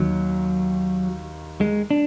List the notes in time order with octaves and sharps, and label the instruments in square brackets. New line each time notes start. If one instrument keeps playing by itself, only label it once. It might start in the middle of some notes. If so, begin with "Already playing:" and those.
Already playing: [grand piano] D#2 D#3 [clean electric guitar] F#3
[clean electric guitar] G#3
D4